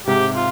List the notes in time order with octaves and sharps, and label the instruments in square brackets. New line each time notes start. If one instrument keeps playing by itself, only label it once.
[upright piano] G#2 C3 [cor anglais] G4
[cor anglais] F4